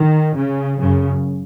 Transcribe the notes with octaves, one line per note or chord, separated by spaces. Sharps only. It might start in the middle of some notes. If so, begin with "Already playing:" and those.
Already playing: D#3
C#3
F#2 C#3